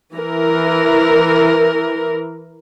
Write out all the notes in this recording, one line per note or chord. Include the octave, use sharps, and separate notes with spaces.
E3 A#4